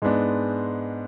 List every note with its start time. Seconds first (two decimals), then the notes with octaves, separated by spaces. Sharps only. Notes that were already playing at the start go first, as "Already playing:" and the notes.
0.02 G#2 G#3 B3 D4